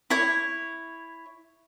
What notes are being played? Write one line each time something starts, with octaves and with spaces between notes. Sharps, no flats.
E4 C#5